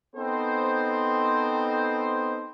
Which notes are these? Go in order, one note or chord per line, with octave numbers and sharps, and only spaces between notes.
B3 C4 D#4 A4 C5